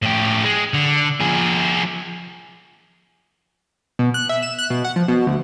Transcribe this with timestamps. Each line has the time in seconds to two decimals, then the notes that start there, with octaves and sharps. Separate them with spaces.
0.02 A2 G4
0.44 G#3
0.74 D3
1.21 F3 G#4
3.99 B2
4.14 F#6
4.29 E5
4.42 E7
4.59 F#6
4.70 B2
4.85 F#5
4.96 F3
5.08 B2
5.27 D2